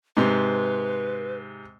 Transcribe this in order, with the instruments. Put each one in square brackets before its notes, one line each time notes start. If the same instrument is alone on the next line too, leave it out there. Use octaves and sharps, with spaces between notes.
[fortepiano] G#2 C3 [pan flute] B4